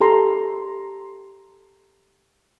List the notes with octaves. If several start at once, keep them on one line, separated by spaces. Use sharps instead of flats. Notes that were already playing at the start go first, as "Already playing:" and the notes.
G4 A4 A#5 C6